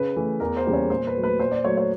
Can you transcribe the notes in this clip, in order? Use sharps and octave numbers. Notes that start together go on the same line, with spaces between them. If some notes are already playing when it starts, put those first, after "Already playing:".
Already playing: C#3 B4
E3 A3
E2 A#4
C5
C#3 E3 G3 A#3
C#5
A#2 C5
B4
F#3 A3
B4
A#2 C5
D5
F#3 A3 C#5
C#5